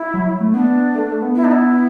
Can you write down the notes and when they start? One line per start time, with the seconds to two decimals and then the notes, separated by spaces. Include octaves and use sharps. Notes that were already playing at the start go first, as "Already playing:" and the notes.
Already playing: E4
0.14 F#3
0.41 A3
0.54 B3 D4
0.95 A3
1.09 A3
1.22 B3
1.35 E4
1.44 D4
1.52 E4